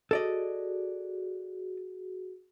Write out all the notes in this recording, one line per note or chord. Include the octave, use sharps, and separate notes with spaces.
F#4 G#4 A4 D5 D#5